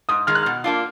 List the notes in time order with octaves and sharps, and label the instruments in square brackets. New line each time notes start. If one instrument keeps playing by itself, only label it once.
[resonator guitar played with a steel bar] G#2 [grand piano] D#6
[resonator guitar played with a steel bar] D#3 G#3 [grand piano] F6
[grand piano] F#6
[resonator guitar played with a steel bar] B2 [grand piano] F6
[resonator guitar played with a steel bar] A#3 D4 F4